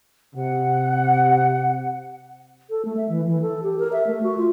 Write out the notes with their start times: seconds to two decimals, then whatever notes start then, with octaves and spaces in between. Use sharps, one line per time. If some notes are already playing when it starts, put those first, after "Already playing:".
0.35 C3 F#5
2.70 A4
2.85 A3
2.97 E5
3.09 E3
3.27 E3
3.42 A4
3.63 G4
3.79 A#4
3.92 E5
4.07 A3
4.23 F#4
4.38 F4